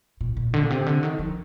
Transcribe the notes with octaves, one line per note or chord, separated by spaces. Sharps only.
A#2
A#2
D3
A#2
C3
D3
D#3
F3